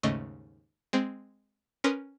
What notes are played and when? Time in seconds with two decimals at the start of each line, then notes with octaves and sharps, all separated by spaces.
0.03 D#2 G#2 C#3 A3 D#5 C#6
0.93 G#3 C4
1.84 C#4 A#4 B4 C6 D#6 D#7